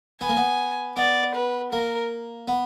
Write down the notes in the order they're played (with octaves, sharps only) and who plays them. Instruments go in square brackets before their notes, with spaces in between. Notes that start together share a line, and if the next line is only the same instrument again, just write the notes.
[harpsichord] B3 [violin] G#5
[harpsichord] A#3
B3
[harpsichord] B3 [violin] D5
[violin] B4
[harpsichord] A#3 [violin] A#4
[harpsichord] B3